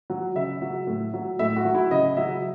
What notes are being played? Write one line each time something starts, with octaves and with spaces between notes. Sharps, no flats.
F#3
C#3 E5
F#3
A2
F#3
A2 E5
F#4
F#3
E4
C#3 D#5
F#3 E5